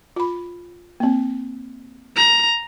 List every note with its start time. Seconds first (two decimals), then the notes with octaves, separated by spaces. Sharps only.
0.16 F4 B5
1.00 A#3 C4
2.16 A#5